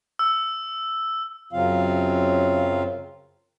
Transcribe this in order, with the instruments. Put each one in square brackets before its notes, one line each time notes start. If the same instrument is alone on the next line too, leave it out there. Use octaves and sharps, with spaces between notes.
[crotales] E6
[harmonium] F#2 C#3 F#3 C4 F4 F5